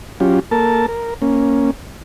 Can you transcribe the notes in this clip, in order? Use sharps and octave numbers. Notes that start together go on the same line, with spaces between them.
F#3 C#4 F4 G4
A#3 A4 A#4 A5
A#4
A#3 C#4